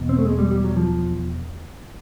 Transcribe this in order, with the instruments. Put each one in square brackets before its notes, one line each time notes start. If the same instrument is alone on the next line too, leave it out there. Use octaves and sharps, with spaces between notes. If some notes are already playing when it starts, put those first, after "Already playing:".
Already playing: [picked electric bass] E2 B2
C4
A3
G#3
G3
G3
F#3
F3